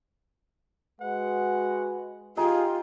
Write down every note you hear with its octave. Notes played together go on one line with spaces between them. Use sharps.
G#3 F#4 B4 F#5
D#4 F4 G4 G#4 G5